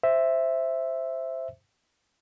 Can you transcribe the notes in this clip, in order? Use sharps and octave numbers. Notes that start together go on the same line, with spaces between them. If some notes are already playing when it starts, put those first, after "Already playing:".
C5 E5